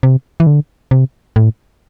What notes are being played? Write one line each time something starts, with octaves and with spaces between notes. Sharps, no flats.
C3
E3
D3
C3
A2